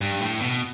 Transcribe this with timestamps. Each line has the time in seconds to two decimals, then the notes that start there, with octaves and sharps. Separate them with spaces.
0.01 G2
0.21 A2
0.41 B2